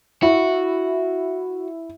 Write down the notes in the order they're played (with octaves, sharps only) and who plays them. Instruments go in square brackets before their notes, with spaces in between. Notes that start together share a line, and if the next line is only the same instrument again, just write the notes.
[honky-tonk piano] E4 [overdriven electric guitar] F#4